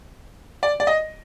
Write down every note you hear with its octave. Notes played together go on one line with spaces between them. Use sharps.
D5
D5
D#5